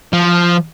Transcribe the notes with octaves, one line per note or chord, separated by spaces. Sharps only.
F3